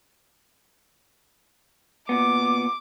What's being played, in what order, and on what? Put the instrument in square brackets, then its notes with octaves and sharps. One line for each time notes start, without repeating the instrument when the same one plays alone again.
[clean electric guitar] A#2 B3 [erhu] D6